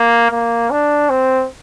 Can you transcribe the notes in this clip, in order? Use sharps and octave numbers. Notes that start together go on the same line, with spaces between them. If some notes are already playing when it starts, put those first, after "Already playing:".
Already playing: A#3
A#3
D4
C4